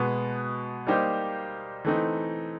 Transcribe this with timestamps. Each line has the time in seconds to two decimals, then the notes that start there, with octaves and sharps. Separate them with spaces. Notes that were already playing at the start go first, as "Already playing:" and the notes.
Already playing: B2 G#3 B3
0.87 G3 A#3 D#4 G4 C5
1.85 E3 A3 C4 D#4